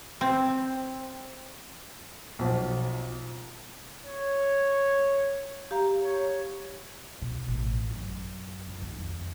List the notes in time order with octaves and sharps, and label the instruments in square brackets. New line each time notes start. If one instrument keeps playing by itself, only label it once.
[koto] C4
[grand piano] B1 F3
[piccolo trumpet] C#5
[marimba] G4 F5 A#5
[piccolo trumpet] C#5
[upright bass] B2
A1
F#2
F#2
D#3
F2